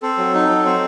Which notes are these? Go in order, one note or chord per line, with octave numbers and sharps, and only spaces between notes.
C4 A4
F#3
D#4
F#3
C4